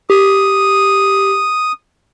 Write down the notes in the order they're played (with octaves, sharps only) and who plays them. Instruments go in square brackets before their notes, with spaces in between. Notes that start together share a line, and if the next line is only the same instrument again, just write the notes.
[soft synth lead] G4 [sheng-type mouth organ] D#6